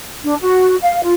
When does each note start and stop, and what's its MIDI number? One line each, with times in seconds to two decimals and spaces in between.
0.24 0.35 62
0.41 0.76 66
0.82 1.02 77
1.03 1.14 65